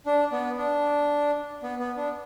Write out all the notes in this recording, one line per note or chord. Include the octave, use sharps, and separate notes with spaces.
D4
B3
D4
B3
B3
D4